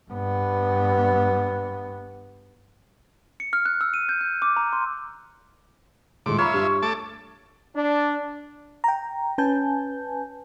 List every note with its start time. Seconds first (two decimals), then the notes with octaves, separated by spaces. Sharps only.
0.11 G2 B3
3.40 C#7
3.53 F6
3.66 F#6
3.81 E6
3.94 D#7
4.09 G6
4.21 F#6
4.42 D6
4.56 A#5
4.73 C6
6.26 D#1 A2 G#3 C6 D6
6.38 F4 C#5 E5 A#5 B5
6.54 G2 C6 C#6
6.82 A3 A5 D6
7.76 D4
8.84 G5 A#5
9.38 C#4 B4 G#5 A5 G6